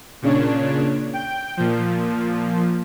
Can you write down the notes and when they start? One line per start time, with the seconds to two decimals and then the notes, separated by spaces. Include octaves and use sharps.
0.22 A#2 C#3 D4 C#5
1.13 G5 G6
1.57 A#2 F3